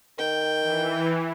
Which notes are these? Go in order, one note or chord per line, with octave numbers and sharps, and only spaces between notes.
D#3 G5
E3